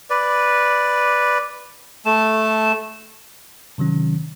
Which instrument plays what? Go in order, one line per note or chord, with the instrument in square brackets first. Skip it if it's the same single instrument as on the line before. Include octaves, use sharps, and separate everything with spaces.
[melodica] B4 D5
A3 A5
[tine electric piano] C3 D#3 F#3 C#4